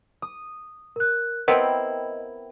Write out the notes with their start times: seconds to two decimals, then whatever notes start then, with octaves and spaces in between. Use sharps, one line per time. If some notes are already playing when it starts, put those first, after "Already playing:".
0.22 D#6
0.96 A#4 F#6
1.48 B3 C4 E4 A#4 D#5 G5